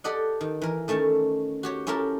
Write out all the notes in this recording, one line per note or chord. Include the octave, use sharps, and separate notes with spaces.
G4 A4 D5 D#5 F#5
D#3
E3 A#4
D#3 A3 C#4 A5
F#4 G4 C#5
C#4 E4 G4 A4 A#4 A#5